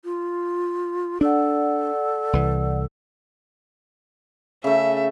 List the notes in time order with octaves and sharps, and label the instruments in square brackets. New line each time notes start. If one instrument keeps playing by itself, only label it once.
[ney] F4
[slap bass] D4 [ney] A4 [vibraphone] D5 F#5
[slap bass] C2 E3
[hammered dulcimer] C#3 A3 [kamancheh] E5